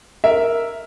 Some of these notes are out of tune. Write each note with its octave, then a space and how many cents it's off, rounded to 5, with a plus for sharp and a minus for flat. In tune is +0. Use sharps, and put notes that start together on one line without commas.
A#4 +0 E5 +0